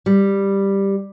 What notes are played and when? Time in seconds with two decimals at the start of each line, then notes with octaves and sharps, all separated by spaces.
0.06 G3